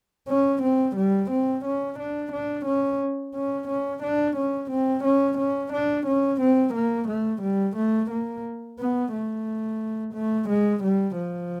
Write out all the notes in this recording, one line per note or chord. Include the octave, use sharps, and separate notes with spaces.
C#4
C4
G3
C4
C#4
D4
D4
C#4
C#4
C#4
D4
C#4
C4
C#4
C#4
D4
C#4
C4
A#3
A3
G3
A3
A#3
B3
A3
A3
G#3
G3
F3